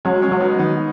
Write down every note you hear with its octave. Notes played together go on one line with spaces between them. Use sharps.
F#3 G#3 C#4
G#3 C#4
F#3
B3 D#4
D#3 B3 D#4